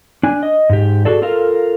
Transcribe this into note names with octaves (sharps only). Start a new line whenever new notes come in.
D4 G#5
D#5
G#2 G4
F#4 G#4 A4 D5
F4 A4 A#4 F5